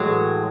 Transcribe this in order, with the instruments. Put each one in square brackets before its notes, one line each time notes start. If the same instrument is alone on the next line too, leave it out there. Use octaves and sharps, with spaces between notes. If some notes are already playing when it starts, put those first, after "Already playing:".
Already playing: [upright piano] A2 E3 A3 [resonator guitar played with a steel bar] F#3 G#3